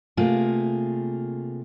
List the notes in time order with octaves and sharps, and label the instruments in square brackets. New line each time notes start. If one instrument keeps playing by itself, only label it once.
[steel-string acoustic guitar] C3 A3 A#3 F4 G#4